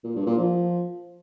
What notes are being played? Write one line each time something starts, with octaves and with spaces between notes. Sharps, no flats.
A#2
G2
A#2
F3